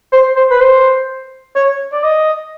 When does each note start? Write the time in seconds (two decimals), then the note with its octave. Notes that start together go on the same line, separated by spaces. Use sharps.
0.12 C5
0.36 C5
0.51 B4
0.60 C5
1.56 C#5
1.92 D5
2.04 D#5